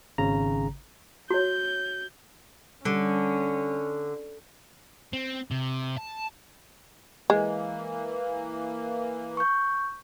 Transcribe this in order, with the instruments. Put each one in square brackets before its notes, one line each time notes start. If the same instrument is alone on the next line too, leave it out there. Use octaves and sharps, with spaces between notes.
[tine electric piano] G#1 C#3 A#5
[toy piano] F#4 C#5 [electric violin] G6
[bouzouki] D3 [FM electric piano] G3 [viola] C#4
[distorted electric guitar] C4
C3
A5
[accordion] E3 A#3 [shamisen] G#3
[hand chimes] C#6 G6